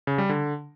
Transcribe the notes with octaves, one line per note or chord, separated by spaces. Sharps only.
C#3
G3
D3